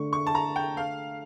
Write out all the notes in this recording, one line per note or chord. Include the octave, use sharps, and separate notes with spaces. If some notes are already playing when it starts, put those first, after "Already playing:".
Already playing: D3 A3 D4 C#6
C#6
A5
A#5
G5
F5